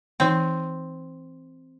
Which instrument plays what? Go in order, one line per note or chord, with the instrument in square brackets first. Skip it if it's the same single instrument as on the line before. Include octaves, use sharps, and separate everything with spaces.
[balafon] E3 D#4 [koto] C4